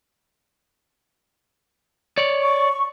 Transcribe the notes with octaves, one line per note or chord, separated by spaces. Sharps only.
C#5 D5
C#6